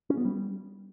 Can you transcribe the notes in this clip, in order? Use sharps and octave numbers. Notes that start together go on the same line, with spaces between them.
C#4
B3
G3